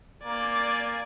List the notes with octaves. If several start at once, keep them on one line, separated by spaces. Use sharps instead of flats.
A#3 D5 G#5